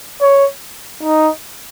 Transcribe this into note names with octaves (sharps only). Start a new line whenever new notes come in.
C#5
D#4